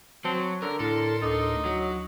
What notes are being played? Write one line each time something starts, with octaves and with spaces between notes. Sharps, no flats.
F#3 C4 A5
D3 A#4
A2 E4 A4 A#4 C6 F6
D2 D#4 D6
F#3 F#4